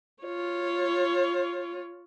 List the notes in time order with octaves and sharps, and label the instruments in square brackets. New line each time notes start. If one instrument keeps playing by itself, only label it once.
[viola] F4 C#5